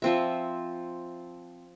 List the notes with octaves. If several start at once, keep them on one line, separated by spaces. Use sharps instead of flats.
F3 C4 E5